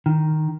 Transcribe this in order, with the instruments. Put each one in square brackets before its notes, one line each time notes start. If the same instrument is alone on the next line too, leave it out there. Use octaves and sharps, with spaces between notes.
[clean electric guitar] D#3